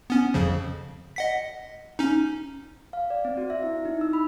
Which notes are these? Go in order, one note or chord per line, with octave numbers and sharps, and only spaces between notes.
B3 C#4
F2 C#3 F3
D#5 F#5 B6
C#4 D#4
F5
D5
C4
F#4
E5
E4
D#4
E6
B5